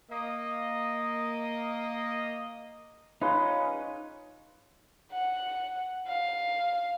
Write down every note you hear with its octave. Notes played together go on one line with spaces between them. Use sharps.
A#3 D#5
G#3 C#4 D#4 F4 B4 D#5 C6
F#5
F5